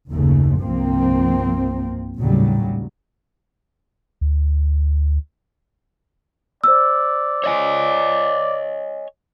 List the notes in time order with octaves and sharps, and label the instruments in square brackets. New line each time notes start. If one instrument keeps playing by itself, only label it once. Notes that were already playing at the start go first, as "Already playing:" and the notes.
[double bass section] F#1 D#2 C#3 A3
C2 G2 F3 A#3 C4
A#1 D#2 A2 C#3 F#3 G3
[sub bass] D2
[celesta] C5 E6 [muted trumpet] D5
[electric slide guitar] C#5 D#5 G#5